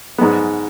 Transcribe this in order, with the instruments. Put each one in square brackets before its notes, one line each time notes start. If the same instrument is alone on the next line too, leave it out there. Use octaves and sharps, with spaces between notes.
[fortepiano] G#2 G#3 B3